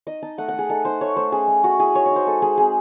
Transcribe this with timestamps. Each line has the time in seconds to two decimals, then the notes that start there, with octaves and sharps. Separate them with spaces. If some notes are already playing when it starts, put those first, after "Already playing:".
0.07 D#4 D#5
0.22 D#4 A5
0.38 A3 F#5
0.48 F#5
0.54 A3
0.59 G#4
0.69 D#4 A4
0.85 D#4 C5
1.01 A3 C#5
1.16 A3 C5
1.32 C#4 G#4
1.48 A3
1.63 A3 F#4
1.79 E4 G#4
1.95 D#4 C#5
2.06 C#5
2.11 D#4 C5
2.26 G#3 A4
2.42 G#3 G#4
2.57 C4 G#4